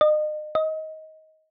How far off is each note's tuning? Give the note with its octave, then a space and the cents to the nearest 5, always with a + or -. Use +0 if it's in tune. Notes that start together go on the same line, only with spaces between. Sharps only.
D#5 -35
D#5 +20